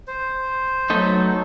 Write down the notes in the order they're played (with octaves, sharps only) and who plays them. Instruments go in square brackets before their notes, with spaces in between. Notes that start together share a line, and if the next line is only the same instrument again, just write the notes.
[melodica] C5
[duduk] F#3 [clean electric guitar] A3 B3 D#4